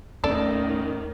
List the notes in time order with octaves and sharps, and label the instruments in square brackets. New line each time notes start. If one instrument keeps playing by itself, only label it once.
[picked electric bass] D#2 B3 C#4 [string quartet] A2 D#3 [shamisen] A4 D5